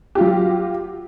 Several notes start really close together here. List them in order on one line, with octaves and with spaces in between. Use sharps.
G4 F4 F#3